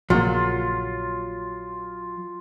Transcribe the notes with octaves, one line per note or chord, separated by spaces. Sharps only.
A#1 C#3 F#3 A#3 F4